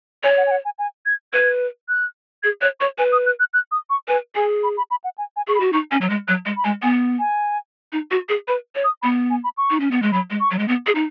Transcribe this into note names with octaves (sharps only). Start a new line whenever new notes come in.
C#5 G#5
F#5
G#5
F#5
G#5
G#5
G#6
B4 G#6
F#6
G#4 G#6
C#5 F#6
C#5 C#6
B4 G#5
D#6
F#6
F#6
F#6
D#6
C#6
B4 G#5
G#4 G#5
B5
B5
B5
F#5
G#5
G#5
G#4 C#6
B5
F#4
D#4 C#6
C#4 G#5
F#3
G#3
F#3 F#6
G#3
B5
G#3 G#5
B3 G#5
G#5
D#4
F#4
G#4
B4 B5
C#5
D#6
B3 B5
G#5
B5
C#6
D#4
C#4
B3
G#3
F#3 B5
G#3
C#6
F#3
G#3
B3
G#4
D#4